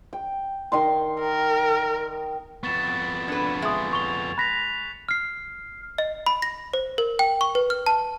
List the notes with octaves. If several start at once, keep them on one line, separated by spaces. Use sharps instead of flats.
G5
D#3 D#4 C6
A#4
F2 B3 C#6 A6 E7
D4 B4 G#6 C#7
G#3 E5 D#6
C#6 F7 G7
B5 F#6 A#6 B6 F7
F6 C7
D#5
B5
A#6
C5
A#4
G5
C#6
B4
F6
A5